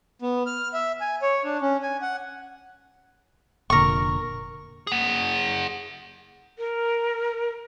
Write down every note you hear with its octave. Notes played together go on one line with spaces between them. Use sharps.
B3
F6
E5
G#5
C#5
D4
C#4
G#5
F#5
F1 A#2 D3 A#4 C#6
G#4 F#5
A#4